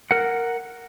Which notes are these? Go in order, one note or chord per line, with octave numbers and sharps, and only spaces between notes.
A#4 F#5